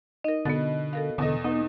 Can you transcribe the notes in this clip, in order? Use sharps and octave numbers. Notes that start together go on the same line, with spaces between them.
D#4 A#4 D#5
B2 D3 B3 A6
A4 A#4 F5
E2 B2 D3 A4 D#5
B3 D#4